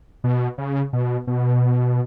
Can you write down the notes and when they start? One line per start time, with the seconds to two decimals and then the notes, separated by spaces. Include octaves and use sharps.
0.24 B2
0.58 C#3
0.93 B2
1.27 B2